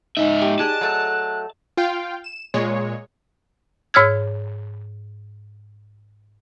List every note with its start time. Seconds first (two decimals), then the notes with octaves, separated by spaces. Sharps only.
0.17 G#2 D#4 E5
0.42 G4
0.59 G#4 D5 D#5 A5 F#6
0.81 F#3 A3
1.77 F4 F5 G5
2.24 E7
2.54 A#2 G#3 C#5
3.94 G#2 C#5 E6 F6 G#6